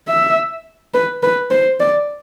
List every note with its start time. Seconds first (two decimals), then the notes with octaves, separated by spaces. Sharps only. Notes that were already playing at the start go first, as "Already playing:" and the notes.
0.08 E5
0.94 B4
1.23 B4
1.51 C5
1.80 D5